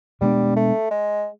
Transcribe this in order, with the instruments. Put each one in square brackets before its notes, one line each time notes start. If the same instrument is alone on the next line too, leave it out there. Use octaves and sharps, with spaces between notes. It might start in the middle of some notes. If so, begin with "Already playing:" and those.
[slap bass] B2 G#3 B3 D4 [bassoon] G3
[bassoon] A3
G#3